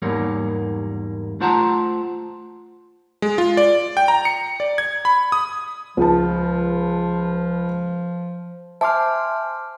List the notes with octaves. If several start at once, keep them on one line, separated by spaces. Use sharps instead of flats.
E2 G#2 G3 A#3 C#5
A3 F4 C5 F#5 A5 A#5
G#3
F4
D5
G5
A#5
C#7
D5
G#6
B5
D#6
C#2 F3 A5
C5 E5 G#5 A5 C6 D6 F6